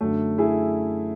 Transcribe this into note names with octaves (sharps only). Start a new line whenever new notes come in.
F#2 D3 A3
E4 G#4